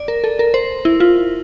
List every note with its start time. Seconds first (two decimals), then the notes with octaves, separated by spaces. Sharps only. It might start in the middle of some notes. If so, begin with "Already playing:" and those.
Already playing: D5
0.08 A#4
0.24 A4
0.39 A#4
0.54 C5
0.85 E4
1.00 F4